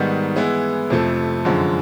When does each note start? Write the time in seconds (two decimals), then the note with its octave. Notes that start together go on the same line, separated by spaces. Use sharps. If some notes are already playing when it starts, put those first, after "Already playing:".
Already playing: G#2 D#3 G3 B3 D#4
0.36 E3 G#3 B3 E4
0.90 F2 C3 F3 A3
1.45 F#2 D3 F3 G#3